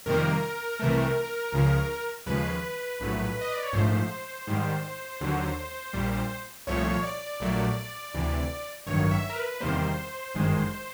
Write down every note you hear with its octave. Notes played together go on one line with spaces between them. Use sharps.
F2 C3 D#3 G3 A#3 A#4
C2 C3 E3 A3
C#2 C#3 F3
D#2 C#3 F3 G#3 B4
A#1 A2 F#3 A3
D#5
D5
C#5
A#1 G#2 F3 A3 C5
G#2 D#3 G3
D#2 D3 F#3
A#1 A#2 G3
C2 A#2 F3 A3 C#5
D5
A#1 A#2 F#3 A3
D2 C3 E3
A1 G2 D#3 F#3 C#5
E5
A#4
B4
B4
E2 C3 D#3 G3 A#3 C5
G1 F#2 D#3 G#3